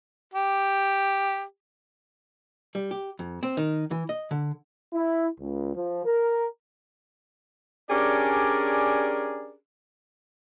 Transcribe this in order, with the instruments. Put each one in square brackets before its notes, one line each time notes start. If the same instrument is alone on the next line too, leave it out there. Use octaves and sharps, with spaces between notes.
[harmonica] G4
[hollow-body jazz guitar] G3
G4
F2
C4
D#3
E3
D#5
D3
[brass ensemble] E4
C#2
F3
A#4
[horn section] C#4 D4 G4 G#4 A#4 D5